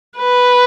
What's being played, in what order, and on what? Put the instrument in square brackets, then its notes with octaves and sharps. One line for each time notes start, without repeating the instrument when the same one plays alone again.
[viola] B4